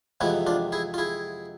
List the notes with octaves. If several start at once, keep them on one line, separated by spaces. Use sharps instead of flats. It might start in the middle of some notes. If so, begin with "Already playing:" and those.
F2 C3 E3 G#3 B3 E4
D4 F4
E4 G#4
F4
E4 G#4